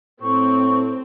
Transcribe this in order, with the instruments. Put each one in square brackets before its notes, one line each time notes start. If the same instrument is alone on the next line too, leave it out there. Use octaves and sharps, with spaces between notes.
[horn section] A2 [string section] C4 [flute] C#6